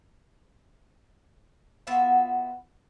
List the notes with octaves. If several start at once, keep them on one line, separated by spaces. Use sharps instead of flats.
B3 F4 F#4 E5